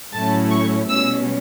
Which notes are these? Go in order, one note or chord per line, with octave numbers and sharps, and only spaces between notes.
A2 F#3 A3 C#4 E4 A5
C#6
B2 G3 C#4 E6